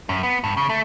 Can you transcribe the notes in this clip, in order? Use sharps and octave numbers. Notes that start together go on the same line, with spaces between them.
F#2
B3
G2
C#3
A3